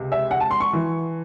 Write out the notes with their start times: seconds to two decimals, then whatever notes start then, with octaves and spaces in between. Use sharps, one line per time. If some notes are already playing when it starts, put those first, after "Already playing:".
Already playing: C#2 C3
0.12 E5
0.31 F#5
0.40 A5
0.51 C6
0.60 C#6
0.73 E3